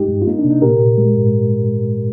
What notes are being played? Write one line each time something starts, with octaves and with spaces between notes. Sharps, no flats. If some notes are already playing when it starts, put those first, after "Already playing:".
Already playing: G#2 G#3 D#4 G4
G2
F4
A#3 D#4
D4
C3
D#4
A#2 G4 A#4
A#2
G#3
G#2